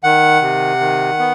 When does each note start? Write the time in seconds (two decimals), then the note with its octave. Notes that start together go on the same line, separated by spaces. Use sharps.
0.04 D#3 F#5
0.42 C3
0.80 D#3
1.19 B3